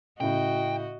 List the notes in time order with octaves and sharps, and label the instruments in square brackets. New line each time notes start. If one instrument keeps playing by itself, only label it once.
[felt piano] A2 C#3 [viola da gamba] F#4 D#5 [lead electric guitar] G5